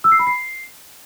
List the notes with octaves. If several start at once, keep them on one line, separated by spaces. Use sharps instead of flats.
E6
C7
B5
C7